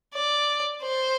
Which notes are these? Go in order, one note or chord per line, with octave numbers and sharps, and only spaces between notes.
D5
C5